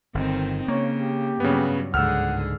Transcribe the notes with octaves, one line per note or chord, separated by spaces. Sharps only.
G1 D#3 C4 D#4
C#3 A#3 C#5
G4
G2 C#3 F#3 B3 C#4
C#2 G#2 D3 G#4 F#5 E6 F6